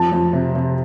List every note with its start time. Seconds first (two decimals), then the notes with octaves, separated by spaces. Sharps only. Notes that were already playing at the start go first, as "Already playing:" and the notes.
Already playing: F2 A5
0.12 F2
0.33 C3
0.55 C3